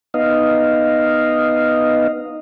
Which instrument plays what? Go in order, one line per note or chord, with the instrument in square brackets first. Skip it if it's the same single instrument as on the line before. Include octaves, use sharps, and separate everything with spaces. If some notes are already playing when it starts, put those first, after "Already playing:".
[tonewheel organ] B3 D#4 D#5 F5